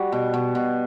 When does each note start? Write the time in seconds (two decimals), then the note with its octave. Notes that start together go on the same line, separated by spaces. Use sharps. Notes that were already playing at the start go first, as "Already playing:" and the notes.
Already playing: G3 F#4
0.12 B2
0.34 B2
0.55 B2